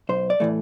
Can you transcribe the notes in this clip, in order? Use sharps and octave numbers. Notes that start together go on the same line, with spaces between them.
B1 C5
D5
A2 E3 A3